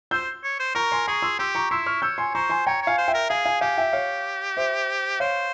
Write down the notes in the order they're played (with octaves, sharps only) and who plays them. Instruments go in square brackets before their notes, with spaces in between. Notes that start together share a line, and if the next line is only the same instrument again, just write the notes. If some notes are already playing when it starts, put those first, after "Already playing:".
[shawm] C5 [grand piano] E6 G6
[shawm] C#5
C5
[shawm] A#4 [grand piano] A#5 C#6
[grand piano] G#5 C6
[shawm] G#4 [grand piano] A#5 C#6
[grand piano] C6 E6
[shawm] G4 [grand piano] C6 E6
[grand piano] A#5 C#6
[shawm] E4 [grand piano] C6 E6
[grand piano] C#6 F6
[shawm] C#5 [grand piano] E6 G6
[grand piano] G#5 C6
[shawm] C5 [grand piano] A#5 C#6
[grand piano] G#5 C6
[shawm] C#5 [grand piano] G5 A#5
[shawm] C#5
[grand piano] F5 G#5
[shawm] C5
[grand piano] E5 G5
[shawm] A#4
[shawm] G#4 [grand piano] F5 G#5
[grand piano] F5 G#5
[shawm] G4 [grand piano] F5 G#5
[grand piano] E5 G5
C#5 F5
C5 E5
[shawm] C5 [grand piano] C#5 F5